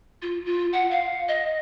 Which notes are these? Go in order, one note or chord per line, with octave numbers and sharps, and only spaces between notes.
F4
F4
F#5
F5
D#5